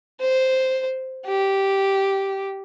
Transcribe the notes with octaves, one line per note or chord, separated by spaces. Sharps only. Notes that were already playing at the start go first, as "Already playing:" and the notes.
C5
G4